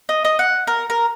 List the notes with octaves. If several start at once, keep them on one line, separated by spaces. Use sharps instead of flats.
D#5
D#5
F#5
A#4
A#4